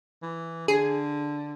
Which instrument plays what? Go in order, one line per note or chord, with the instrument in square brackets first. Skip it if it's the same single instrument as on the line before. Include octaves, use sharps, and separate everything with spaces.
[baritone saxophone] E3
[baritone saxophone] D3 [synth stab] G#4